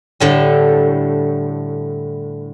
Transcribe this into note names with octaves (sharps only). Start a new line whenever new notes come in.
A2 D3 G3